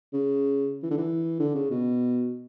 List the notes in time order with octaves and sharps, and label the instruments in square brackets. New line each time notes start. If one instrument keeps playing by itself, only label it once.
[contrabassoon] C#3
E3
D3
E3
D3
C#3
B2